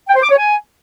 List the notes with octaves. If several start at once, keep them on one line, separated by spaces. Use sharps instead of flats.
G5
C5
D6
C#5
G#5